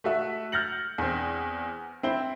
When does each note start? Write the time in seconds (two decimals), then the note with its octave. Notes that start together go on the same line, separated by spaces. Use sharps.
0.04 A3 F#4 E5
0.52 F6 G6 A6 A#6 C#7 F#7
0.98 E2 C4
2.03 C4 E4 G7